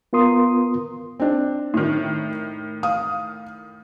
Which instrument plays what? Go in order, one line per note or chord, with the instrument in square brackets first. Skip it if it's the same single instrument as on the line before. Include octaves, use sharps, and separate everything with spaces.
[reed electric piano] B3 F4 A#4 C6 D#6
[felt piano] C4 D4
[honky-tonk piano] A2 D#3
[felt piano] F5 D#6